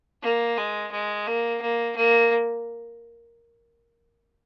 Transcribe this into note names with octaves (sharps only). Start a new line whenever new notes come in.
A#3
G#3
G#3
A#3
A#3
A#3